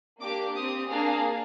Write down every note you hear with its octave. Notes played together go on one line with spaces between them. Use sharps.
A#3 D4 G4 D6
C4 G4 D#6
A#3 D4 G#4 F5